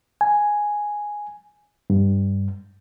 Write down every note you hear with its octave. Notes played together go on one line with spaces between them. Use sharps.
G#5
G2